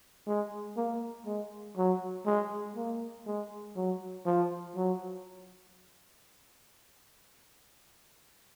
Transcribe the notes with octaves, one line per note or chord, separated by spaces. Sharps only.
G#3
A#3
G#3
F#3
G#3
A#3
G#3
F#3
F3
F#3